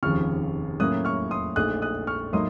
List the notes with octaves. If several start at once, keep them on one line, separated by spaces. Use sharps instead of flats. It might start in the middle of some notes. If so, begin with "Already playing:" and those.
F1 D#2 C#3 F3 C#6 F6
A2 F#3 A#3 C#4 D#6 F#6
C#6 F6
C6 D#6
A#1 A#2 A3 D#4 D#6 F#6
D#6 F#6
C#6 F6
A2 F#3 A#3 D#4 C6 D#6